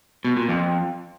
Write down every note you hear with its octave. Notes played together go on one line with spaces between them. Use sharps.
B2
A#2
F2